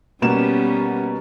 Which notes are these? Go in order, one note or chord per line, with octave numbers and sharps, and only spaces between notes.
B2 G3 A#3 B3 C#4 E7